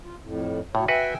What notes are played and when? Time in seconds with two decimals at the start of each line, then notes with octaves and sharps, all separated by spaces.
0.03 F4
0.22 F2 A2
0.75 A2 F#3 C#5
0.88 F#4 B4 E5 G5 G#5